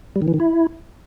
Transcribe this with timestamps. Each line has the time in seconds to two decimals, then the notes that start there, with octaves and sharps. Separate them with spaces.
0.16 G3
0.22 D#3
0.28 E3
0.34 D#3
0.40 E4